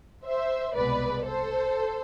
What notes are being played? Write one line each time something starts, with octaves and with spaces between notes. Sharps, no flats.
C5 E5
C2 B2 G#3 B3 B4 D5
A4 C5